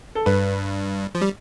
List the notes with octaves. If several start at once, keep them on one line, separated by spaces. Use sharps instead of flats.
A4
G2 B4
F3
G3